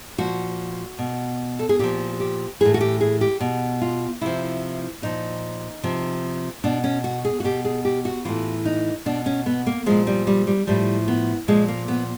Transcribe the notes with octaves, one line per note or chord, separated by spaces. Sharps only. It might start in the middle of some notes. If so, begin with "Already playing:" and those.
A#2 F3 F#4
B2
A4
G#4
A#2 F3 G4
G4
A2 E3 G#4
F#4
G4
G#4
G4
B2
F4
C3 F3 E4
A#2 F3 D#4
C3 F3
B2 D4
C#4
F#4
G#4
F#4
B2 G4
G#4
G4
F#4
A2 E3 F4
D#4
B2 D4
C#4
B3
A#3
A#2 F3 G#3
G3
G3
G3
A2 F3 G3
B3
A#2 F3 G#3
A#3
B3